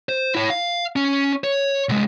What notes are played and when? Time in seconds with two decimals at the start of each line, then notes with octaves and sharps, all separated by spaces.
0.09 C5
0.35 E4 C#5
0.50 F5
0.96 C#4
1.44 C#5
1.89 C2 G#3